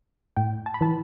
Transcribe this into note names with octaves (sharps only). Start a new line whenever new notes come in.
A2 G5
A5
B5
E3 A5